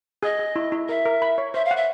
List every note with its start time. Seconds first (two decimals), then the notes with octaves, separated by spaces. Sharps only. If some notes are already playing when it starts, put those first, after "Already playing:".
0.23 G#4 D#5
0.39 G#4
0.56 E4
0.72 E4
0.89 A#4 E5
1.05 A#4
1.22 B5
1.38 C#5
1.54 C5 E5
1.65 F5
1.71 F#5
1.76 E5